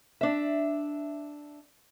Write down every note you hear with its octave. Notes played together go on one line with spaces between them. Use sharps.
D4 E5